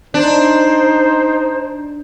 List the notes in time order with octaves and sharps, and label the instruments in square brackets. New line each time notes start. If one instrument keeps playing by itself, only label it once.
[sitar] D4 [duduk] D#4 [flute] C5